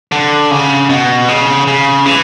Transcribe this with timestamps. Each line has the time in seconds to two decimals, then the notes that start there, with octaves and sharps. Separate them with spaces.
0.12 D3
0.51 C#3
0.89 B2
1.28 C#3
1.67 C#3
2.06 E3